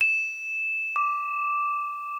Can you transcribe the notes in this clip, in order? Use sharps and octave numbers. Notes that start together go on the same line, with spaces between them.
E7
D6